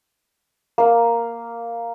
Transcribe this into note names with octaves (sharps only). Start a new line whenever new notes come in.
A#3 F5